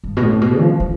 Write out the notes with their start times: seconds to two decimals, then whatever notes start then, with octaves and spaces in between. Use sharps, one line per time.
0.04 G2
0.17 B2
0.22 A2
0.41 B2
0.60 F3
0.80 D3